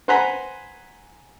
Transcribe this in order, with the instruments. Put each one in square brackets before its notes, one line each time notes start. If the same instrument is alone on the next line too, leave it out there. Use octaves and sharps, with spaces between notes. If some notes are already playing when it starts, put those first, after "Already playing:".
[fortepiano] B4 C5 F#5 G#5 A#5 B5